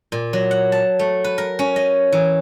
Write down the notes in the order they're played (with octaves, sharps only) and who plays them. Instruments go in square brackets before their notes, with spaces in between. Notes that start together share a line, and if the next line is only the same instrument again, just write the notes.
[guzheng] A#2
F#3
F#5
A5
A3
B4
A#4
C#4
D#5
E3